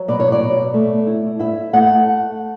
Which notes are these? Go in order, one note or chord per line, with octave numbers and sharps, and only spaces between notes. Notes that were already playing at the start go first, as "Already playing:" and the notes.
Already playing: F#3
B2 D5
C#5
D5
B2
A3
E4
E4 E5
A3 F#5